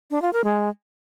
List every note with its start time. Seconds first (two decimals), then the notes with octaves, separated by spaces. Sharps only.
0.11 D4
0.22 F4
0.33 A#4
0.44 G#3